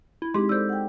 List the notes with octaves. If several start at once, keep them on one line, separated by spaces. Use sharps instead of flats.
E4
G#3 C4 D#4 G4 G#4 C6
A4 C5 D5 E6 G6
F#5 G5